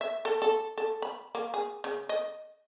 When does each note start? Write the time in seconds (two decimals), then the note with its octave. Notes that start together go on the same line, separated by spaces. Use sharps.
0.01 E5
0.25 A4
0.42 A4
0.78 A4
1.02 B5
1.35 A#3
1.54 G#4
1.84 C#3
2.09 D#5